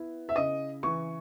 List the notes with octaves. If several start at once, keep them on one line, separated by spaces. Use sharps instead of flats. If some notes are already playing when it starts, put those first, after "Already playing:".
Already playing: B3 E4
E5
C#3 D#5
E3 C#6